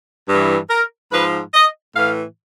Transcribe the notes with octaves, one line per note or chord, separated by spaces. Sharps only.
G2 E3
A#4
G#2 F3 B4
D#5
A2 E3 F5